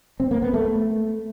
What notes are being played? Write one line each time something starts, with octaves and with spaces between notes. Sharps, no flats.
C4
A#3
B3
A3